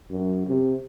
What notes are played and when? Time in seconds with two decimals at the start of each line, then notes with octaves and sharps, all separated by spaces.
0.10 F#2
0.47 C3